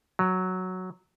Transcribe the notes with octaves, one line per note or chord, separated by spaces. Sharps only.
F#3